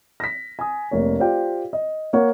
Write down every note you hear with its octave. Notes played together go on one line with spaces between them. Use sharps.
A#6 B6
G#5 D#6
F1 A#3 C#5
F4 G4 C5 D5 F5 G5
D#5
A#3 C#5 F#5